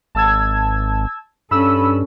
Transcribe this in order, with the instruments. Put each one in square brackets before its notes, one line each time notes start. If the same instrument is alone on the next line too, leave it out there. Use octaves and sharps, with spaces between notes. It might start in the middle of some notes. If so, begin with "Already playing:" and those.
[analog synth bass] G#1 [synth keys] A5 E6 G#6
[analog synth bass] G2 [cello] C#4 A4 [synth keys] B5 E6